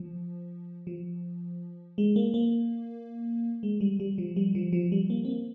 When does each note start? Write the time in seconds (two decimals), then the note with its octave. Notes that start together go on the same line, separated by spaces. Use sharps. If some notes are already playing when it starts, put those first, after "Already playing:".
Already playing: F3
0.87 F3
1.98 G#3
2.16 A#3
2.34 A#3
3.63 G#3
3.81 G3
4.00 G3
4.18 F3
4.36 G3
4.55 F3
4.73 F3
4.92 G3
5.10 A#3
5.25 C4
5.29 A#3